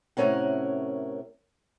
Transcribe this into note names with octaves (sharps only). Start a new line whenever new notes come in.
A2 C3 F3 C#4 A#4 F#5